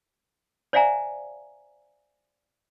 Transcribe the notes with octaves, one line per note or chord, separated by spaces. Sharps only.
C5 D5 E5 F5 G#5 A#5